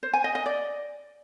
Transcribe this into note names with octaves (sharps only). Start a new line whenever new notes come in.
C5
G#5
D#5
D#5
D5